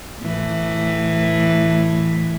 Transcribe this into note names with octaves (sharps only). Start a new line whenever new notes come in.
A2 E3